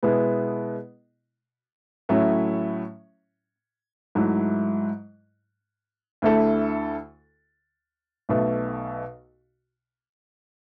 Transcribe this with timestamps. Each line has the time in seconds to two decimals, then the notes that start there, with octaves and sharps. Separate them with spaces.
0.03 B2 G#3 B3 E4
2.09 A2 F#3 A3 C#4 E4
4.15 G#2 F#3 A3 E4
6.22 D2 D3 A3 E4 A4
8.29 B1 B2 A3